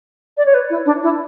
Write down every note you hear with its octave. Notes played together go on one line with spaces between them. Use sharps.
D5
C#5
B4
E4
D4
E4